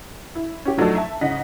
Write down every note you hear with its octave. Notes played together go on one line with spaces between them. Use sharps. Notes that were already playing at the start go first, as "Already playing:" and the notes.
E4
C#4 G4
F3 F#3 A3 D4 D#4 A4
E5 A5
G#2 C#3 D#5 F#5 B6